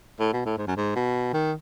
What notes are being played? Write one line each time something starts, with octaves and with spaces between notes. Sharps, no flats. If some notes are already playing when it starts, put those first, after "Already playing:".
A2
B2
A2
G#2
F#2
G#2
B2
D#3